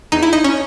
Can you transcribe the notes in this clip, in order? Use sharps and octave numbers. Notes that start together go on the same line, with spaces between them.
E2 D#4
E4
D#4
C#4